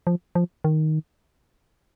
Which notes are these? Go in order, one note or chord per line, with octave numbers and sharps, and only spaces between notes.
F3
F3
D#3